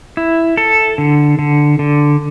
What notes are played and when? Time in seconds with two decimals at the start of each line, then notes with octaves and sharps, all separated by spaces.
0.17 E4
0.57 A4
0.98 D3
1.39 D3
1.79 D3